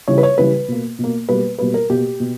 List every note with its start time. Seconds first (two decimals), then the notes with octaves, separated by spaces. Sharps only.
0.08 C#3 E3 G3 C#5
0.18 B4
0.23 C#5
0.38 C#3 E3 G3 B4
0.68 B2 A#3
0.99 B2 A#3
1.29 B2 G3 A#3 B4
1.59 B2 G3 A#3 B4
1.74 A#4
1.90 B2 A#3 G4
2.20 B2